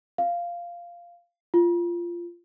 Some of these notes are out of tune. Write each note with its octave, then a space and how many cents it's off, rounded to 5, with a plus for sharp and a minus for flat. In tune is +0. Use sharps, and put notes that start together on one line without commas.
F5 -10
F4 -15